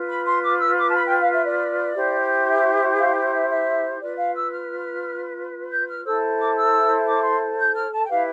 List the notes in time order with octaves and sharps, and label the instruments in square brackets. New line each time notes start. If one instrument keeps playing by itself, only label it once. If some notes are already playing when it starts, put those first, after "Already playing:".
Already playing: [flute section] F4 B4
B5
C6
D6
E6
D6
A5
B5
G5
F5
E5
D5
E4 G4 C5
E5
F5
E5
E5
F4 B4 D5
F5
E6
F6
G6
F6
E4 A4 C5 E6
D6
E6
D6
C6
G6
F6
A5
G5
E4 G4 B4 F5